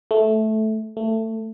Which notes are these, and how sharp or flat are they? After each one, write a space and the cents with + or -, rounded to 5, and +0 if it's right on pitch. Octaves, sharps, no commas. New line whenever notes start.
A3 -10
A3 +20